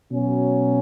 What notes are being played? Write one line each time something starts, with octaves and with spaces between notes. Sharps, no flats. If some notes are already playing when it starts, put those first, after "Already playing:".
B2 F#3 C#4